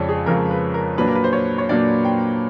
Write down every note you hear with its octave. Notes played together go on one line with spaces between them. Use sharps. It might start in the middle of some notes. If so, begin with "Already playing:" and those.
Already playing: F2 C#3 F3 G#3 C#5 D5
G#4
F2 C#3 F3 G#3 A#4
B4
A#4
A#2 F#3 A#3 D4 B4
A#4
B4
C5
C#5
C#5
A#2 F#3 A#3 D4 D5
G5